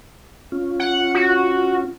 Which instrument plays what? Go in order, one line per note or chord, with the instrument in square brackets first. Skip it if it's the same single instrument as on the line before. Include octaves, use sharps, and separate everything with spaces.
[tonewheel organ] C#4 F4
[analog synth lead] F#5
F#4